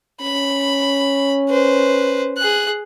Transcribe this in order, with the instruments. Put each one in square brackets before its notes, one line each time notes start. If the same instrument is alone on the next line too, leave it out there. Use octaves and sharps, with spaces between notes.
[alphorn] C#4 [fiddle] B5
[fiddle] B4 C5
G#4 F#6